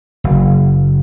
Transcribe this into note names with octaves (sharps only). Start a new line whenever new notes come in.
F#1